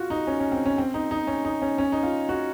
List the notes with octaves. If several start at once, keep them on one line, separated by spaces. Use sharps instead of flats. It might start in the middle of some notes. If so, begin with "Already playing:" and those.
Already playing: F4 F#4
D#4
C#4
C#4
C4
C#4
C4
D#4
D#4
C#4
D#4
C#4
C#4
D#4
F4
F#4